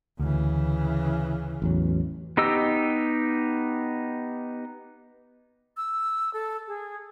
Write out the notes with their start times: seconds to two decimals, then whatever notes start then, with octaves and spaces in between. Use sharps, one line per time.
0.19 D2 C#3 E3
1.62 A1 E2 F#3
2.37 B3 D#4 G4 D#5 E6
5.77 E6
6.34 A4
6.67 G#4